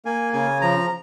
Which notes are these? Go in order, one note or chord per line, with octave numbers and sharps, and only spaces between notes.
A#3 G#5
C#3 G#5
F3 A#5